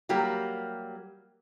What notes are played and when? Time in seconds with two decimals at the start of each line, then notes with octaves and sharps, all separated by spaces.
0.09 F#3 G3 A#3 G4